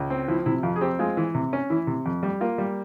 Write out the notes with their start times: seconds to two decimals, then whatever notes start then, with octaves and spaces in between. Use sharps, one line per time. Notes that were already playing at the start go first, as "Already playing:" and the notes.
Already playing: C#2
0.10 C4
0.28 F3 E4
0.46 C3 E4
0.63 F2 F4
0.76 G#4
0.81 C4 G4
0.99 G#3 F4
1.17 E3
1.35 C3
1.53 C#4
1.70 E3 E4
1.87 C3
2.06 F2
2.23 G3
2.41 A#3 F4
2.58 G3